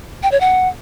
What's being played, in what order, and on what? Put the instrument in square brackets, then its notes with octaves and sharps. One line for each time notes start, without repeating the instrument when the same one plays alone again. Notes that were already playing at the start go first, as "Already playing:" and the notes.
[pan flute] G5
C#5
F#5